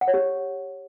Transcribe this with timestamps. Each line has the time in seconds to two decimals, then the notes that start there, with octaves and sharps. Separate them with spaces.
0.01 F#5
0.08 C#5
0.14 G4